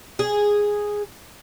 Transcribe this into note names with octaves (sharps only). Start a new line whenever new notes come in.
G#4